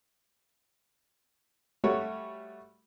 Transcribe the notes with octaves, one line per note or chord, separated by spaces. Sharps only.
G3 A3 F#4 C#5